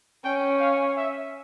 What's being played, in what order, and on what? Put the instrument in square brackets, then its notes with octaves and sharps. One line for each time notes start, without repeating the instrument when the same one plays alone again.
[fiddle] C#4 [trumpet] G5
[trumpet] F5
E5